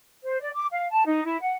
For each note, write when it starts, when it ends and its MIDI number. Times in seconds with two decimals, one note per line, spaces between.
0.25 0.39 72
0.41 0.50 74
0.55 0.66 86
0.72 0.88 77
0.91 1.03 81
1.06 1.23 63
1.24 1.40 64
1.42 1.56 78